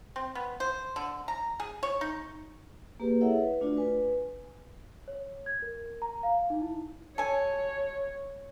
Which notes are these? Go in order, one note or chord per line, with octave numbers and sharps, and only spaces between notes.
C4
B3
C5
D3
A#5
G#4
C#5
D#4
A#3 G4 G#4 B4
E4 G#4 A4 C#5 E5 F#5
B4
A3 D4 F4 F#4 D5
B4 G#5
C#5
G#6
A#4
A#5
F5
D#4
E4
A4 C#5 G#5